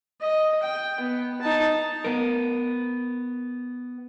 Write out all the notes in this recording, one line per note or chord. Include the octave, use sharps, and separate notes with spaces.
D#5
G5
B3
D#4 A5
B3 A#4